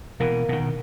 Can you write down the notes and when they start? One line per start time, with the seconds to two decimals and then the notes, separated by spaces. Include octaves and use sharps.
0.20 B2 E3 A#3
0.49 B2 D#3